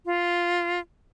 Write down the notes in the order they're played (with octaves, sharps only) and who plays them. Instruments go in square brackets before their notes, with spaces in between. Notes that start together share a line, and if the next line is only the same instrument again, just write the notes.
[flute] F4